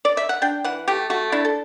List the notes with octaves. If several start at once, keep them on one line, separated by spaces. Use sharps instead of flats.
D5
E5
F#5
D4 G5
E3 F#5
A3 G4
A3 F#4
D4 E4
A4